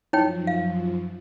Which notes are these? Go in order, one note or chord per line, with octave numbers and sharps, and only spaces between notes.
F#2 F3 D#4 C#5 G5
F5